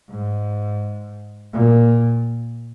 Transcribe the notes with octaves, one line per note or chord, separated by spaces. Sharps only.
G#2
A#2